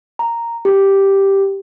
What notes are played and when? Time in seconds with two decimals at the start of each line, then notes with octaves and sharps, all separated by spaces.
0.19 A#5
0.65 G4